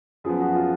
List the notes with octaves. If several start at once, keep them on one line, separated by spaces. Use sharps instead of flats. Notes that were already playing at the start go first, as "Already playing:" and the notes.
F#2 F3 B3 G#4
F#4
F4